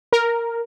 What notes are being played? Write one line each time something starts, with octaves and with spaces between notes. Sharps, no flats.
A#4